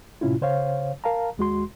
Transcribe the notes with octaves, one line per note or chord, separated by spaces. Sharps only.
A2 C3 C#4 E4 F4
C#3 C5 C#5 F5
A#4 F5 A5 A#5
D#2 G#3 F#4 C6